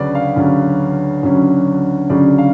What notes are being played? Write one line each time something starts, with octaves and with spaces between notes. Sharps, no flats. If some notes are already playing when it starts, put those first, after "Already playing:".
Already playing: D2 C#3 F#3 C#4 B4 D5
F5
D2 C#3 F#3 C#4
D2 C#3 F#3 C#4
D2 C#3 F#3 C#4 D5
F5